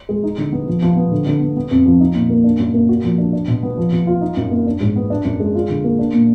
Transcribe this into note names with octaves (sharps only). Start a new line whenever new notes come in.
G#3
D#4
D3
B3
F3
F3
B3
D3
D3
B3
B3
F2
F3
D#4
A#2
A#3
D4
F#2
A#3
F#4
F3
D4
D4
B2
B3
F3
F3
F4
D#4
F#2
A#3
D4
G#2
B3
D4
F#2
G#3
F4
D3
A#3
D4
A#2